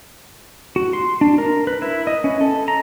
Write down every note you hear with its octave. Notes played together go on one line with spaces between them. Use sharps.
F#4
C6
D4
A#4
B4
E4
D#5
C#4
A4
A#5